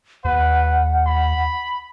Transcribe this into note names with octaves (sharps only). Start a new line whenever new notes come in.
D#2 B4 F#5
B5